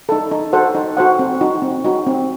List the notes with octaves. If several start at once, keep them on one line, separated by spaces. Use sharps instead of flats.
D#4 A4
D#4
F#4 A4 C5 F#5
D#4
F#4 A4 C5 F#5
C4
D#4 F#4
C4
D#4 F#4
C4